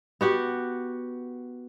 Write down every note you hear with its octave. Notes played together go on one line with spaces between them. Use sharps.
B3 F#4 G4